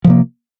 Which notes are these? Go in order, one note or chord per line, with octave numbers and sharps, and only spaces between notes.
C3 F3 A#3